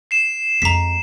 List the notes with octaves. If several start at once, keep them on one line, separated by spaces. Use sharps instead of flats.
C7 E7
F2 G#3 A#5 B6